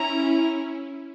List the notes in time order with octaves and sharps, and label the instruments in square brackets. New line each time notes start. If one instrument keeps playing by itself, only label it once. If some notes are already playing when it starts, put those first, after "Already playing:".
Already playing: [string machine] C#4 E4 [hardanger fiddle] A#5